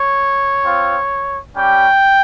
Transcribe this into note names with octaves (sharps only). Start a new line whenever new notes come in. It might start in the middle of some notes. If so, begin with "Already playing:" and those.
Already playing: C#5
C4 F4
G3 C#4 G4 G5